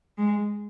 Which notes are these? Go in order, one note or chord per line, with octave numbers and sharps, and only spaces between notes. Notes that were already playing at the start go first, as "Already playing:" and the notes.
G#3